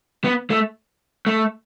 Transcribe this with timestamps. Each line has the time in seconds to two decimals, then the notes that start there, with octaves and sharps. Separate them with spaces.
0.24 B3
0.50 A3
1.26 A3